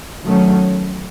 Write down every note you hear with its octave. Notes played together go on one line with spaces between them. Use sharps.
D#3 F#3 A3 C#4